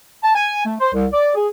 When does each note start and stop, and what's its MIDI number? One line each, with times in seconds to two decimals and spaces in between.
0.23 0.32 81
0.35 0.64 80
0.65 0.75 57
0.80 0.92 72
0.93 1.06 36
1.13 1.33 74
1.35 1.48 68